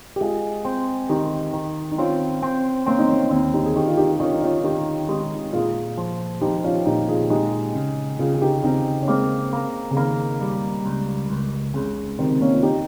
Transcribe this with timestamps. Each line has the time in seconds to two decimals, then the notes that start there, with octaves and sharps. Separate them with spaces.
0.16 G4
0.20 G#3 F4 G#4
0.65 C4
1.09 D#3 D#4 G4
1.54 D#3
1.92 D#4
1.98 C4 C#4 F4
2.42 C4
2.86 A#3 C4 C#4
2.99 D#4
3.09 A#3 C#4
3.31 D#2 C4 D#4
3.54 D#4 G4
3.66 G#4
3.76 D#3 D#4 G4
3.87 F4
3.97 D#4 G4
4.20 D#3 C#4 F4
4.32 D#4
4.42 C#4 F4
4.64 D#3 D#4 G4
5.09 G#3 D#4 G4
5.53 A#2 F4 G#4
5.98 F3
6.41 F3 D#4 G4
6.64 C#4 F4
6.86 A#2 D#4 G4
7.08 F4 G#4
7.30 G#3 D#4 G4
7.75 C#3
8.19 C#3 F4 G#4
8.34 G#4
8.41 D#4 G4
8.64 C#3 C4 D#4
9.02 C#4
9.08 G#3 A#3 C4
9.53 A#3
9.91 C#3
9.97 D#3 A#3
10.41 G3
10.86 C#2
11.30 C#2
11.74 C#2 C#3
12.19 C3 D#3
12.41 A#3 C#4
12.55 F4
12.63 D#4 G4